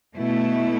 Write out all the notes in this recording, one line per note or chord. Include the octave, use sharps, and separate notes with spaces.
B2 A3 E4